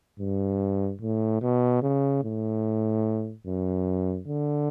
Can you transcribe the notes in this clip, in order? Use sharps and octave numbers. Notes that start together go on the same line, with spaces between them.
G2
A2
B2
C#3
A2
F#2
D3